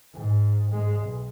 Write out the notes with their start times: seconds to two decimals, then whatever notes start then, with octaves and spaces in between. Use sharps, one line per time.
0.13 G#2
0.71 G#2 G#3
1.00 B1